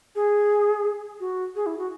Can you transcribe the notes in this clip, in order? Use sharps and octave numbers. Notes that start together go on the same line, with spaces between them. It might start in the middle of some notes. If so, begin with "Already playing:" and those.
G#4
F#4
G#4
E4
F#4